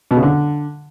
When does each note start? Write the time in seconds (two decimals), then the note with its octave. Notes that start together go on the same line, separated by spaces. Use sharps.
0.11 B2
0.17 C#3
0.23 D3